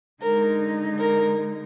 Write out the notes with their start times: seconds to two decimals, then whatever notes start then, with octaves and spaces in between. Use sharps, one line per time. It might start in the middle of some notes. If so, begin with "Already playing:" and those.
0.22 D3 G#3 D#4 A#4
0.98 A#4